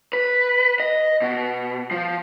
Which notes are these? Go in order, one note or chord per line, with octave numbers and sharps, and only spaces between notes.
B4
D#5
B2
F3